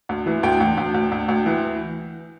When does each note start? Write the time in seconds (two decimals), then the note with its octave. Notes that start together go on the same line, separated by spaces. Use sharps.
0.09 D2
0.26 E3
0.43 D2 G5
0.60 D2
0.77 D2
0.94 D2
1.12 D2
1.28 D2
1.46 E3